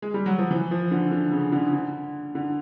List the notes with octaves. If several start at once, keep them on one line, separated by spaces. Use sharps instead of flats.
G#3
G3
F#3
F3
E3
F3
D3
D3
C#3
D3
D3
D3